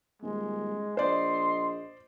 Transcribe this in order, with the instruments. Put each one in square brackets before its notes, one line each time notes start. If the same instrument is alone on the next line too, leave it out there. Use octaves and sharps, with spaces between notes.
[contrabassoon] D#1 [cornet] G#3
[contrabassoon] A#1 [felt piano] C5 D5 [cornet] D#5 [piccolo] C6